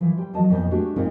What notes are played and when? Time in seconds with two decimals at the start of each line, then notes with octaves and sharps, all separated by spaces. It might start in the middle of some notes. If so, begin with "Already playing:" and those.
0.01 E3 F3
0.17 G3 C5 G5
0.33 E2 F3 F#3 D#5 A5
0.49 F2 A#2 B3 C5 D#5
0.71 G#3 A3 D4 F#4 G4
0.96 A#2 G#3 C4 D#4 F4